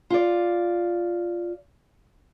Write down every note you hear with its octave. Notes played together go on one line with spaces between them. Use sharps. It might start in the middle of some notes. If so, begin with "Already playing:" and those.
F4 D5